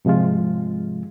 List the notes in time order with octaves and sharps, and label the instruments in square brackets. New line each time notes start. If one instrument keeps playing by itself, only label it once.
[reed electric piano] G#2 C3 F3 G#3 F4